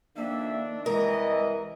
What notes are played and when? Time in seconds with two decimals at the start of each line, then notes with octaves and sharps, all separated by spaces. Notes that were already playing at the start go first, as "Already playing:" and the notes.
0.17 F2 D#3 A#3 D4 E5
0.86 C2 E3 G#3 A#4 D#5